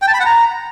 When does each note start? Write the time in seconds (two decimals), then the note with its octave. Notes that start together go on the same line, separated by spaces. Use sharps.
0.02 G5
0.08 A5
0.14 B5
0.20 F#5
0.26 A#5